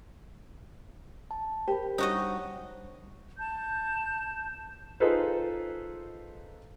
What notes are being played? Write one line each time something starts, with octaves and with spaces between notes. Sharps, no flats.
A5
G4 A#4 C5 B5
G3 D4 D#4 F#4 C5 C#5 D#5
A5 G6
D#4 F4 G#4 A4 B4 C5